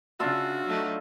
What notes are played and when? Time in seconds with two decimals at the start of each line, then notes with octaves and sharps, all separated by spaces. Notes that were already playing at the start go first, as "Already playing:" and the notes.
0.20 C#3 D4 F4 F#4 E5
0.66 F#3 A3 D#4